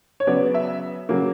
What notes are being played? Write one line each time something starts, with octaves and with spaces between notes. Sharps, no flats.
C#5
C#3 F#3 B3 D5
E5
C#3 F#3 A#3